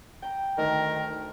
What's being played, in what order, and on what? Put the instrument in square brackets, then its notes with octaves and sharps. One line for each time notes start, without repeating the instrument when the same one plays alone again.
[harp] G5 A#5
[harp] D2 [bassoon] D#3 [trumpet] A#4